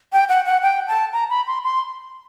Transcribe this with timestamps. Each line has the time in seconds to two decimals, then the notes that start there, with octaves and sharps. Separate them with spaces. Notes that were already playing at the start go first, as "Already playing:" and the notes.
0.13 G5
0.29 F#5
0.46 F#5
0.62 G5
0.88 A5
1.13 A#5
1.30 B5
1.47 C6
1.63 C6